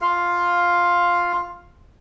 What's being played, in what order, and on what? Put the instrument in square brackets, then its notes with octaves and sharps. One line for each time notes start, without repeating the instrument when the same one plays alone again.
[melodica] F4 F5